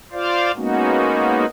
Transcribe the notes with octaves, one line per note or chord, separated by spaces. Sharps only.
F4 C5 D5 F5
G#3 A#3 B3 C#4 D#4 F#4